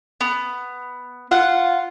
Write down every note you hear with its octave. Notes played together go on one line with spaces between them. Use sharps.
B3
F4 F#5